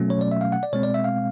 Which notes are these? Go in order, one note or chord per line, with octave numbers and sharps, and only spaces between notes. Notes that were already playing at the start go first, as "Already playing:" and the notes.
Already playing: B2 F#3 A3 C#4
C#5
D5
E5
F5
F#5
D5
B2 G#3 C4 C#5
D5
E5
F5